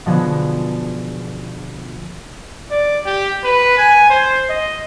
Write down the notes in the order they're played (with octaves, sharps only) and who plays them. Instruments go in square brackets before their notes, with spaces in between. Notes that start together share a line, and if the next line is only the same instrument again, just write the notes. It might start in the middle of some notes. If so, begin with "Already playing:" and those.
[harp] B2 D3 F3 B3 G#4
[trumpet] D5
G4
B4
G#5
C5
D#5